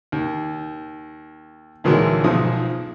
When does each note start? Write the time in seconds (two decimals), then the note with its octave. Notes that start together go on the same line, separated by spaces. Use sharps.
0.12 D#2
1.84 D2 A#2 D#3 E3 F#3 G#3
2.24 B1 G#2 F3 D#6